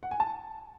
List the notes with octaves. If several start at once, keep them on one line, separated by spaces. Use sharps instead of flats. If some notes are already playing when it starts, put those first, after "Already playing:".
F#5
G#5
A5